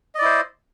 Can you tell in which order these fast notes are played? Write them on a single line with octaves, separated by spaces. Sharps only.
D#5 D5 E4 C5